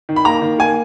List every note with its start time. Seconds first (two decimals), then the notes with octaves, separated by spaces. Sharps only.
0.09 D#3
0.16 B5
0.25 A#3 A#5
0.42 D#3
0.59 A#3 G#5